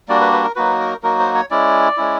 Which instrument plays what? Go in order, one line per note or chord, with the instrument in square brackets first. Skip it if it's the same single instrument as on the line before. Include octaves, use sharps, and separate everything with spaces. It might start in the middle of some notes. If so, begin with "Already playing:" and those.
[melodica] G3 A#3 D4 F#4 D5
B4
B4
A#4
F#3 A#3 D#4 F#4 B4
A#4
F#3 A#3 D#4 F#4 A#4
C5
C#5
G#3 C#4 E4 D5
G#3 C#4 E4